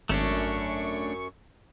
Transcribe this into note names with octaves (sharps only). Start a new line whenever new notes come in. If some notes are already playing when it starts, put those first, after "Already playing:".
G#1 F#2 A3 C#4 D4 C#6